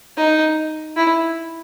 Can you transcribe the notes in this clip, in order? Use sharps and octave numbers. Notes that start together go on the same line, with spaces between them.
D#4
E4